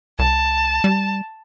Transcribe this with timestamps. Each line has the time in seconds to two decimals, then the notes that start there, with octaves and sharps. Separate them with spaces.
0.19 C2 A5
0.84 G3